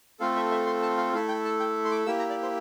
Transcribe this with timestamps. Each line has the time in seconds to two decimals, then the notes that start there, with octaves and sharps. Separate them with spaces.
0.20 A3 C4 F4 A4 F5
0.36 E5
0.51 E5
0.66 C6
0.82 A5
0.97 F5
1.13 A3 E4 A4 F5
1.28 G5
1.45 A5
1.60 G5
1.85 C6
1.91 D6
2.06 A#3 E4 G4 E6
2.19 A#5
2.30 D5
2.42 C5